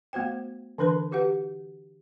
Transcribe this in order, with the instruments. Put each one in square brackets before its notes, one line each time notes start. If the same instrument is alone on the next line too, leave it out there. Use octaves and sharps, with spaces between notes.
[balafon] A3 B3 F#4 C5 G5
D3 E3 D4 A#4 B4 C6
F#4 G4 B4 F#5